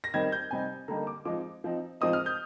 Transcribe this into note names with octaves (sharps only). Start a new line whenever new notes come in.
A#6
D#3 G3 C4 D#4 G#6
G6
C3 G3 C4 D#4 G#5
D3 G3 A#3 D#4 A#5
D6
F3 G#3 C4 D#4 D6
F3 C4 D#4
F3 G#3 C4 D#4 D#6
F6
G6